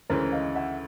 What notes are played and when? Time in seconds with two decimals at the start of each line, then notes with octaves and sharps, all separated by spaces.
0.09 D2 C#3 E3 G#3 C#4 A#4 C5
0.32 D#5 F5
0.55 E5 F#5